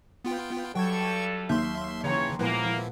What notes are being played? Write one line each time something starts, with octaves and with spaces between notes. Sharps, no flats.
B3 F4 G5
G2 F#3 A4 G5 C#6 G#6
D#2 E5 C6 F6 G6
C#3 E3 C#5 G5 A#5 C6
A#2 F3 G#3 A#3 B3 E4